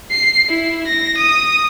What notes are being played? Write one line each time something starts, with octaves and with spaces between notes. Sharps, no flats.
C7
E4
A#6
D#6